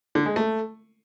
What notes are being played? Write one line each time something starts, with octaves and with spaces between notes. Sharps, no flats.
D3
G#3
A3